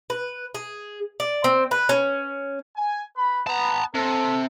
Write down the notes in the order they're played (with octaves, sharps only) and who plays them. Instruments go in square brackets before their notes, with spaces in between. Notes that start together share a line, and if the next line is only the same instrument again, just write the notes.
[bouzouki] B4
G#4
D5
C4
B4
C#4
[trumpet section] G#5
B4 B5
[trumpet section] B3 [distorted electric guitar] A5 A#5
[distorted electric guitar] C3 [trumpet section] A4